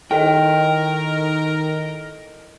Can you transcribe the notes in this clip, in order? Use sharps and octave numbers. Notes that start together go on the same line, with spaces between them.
D#3 E4 A4 A#4 D#5 G5